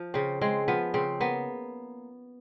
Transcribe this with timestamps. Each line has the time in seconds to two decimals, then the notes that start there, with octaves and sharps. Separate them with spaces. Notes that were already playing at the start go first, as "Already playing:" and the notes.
Already playing: F3
0.14 C#3 C4
0.41 G#3 C4
0.68 F3 B3
0.94 C#3 C4
1.20 A#3 B3